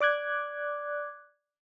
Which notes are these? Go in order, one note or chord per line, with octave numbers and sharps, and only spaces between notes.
D5 D6 F#6 G#6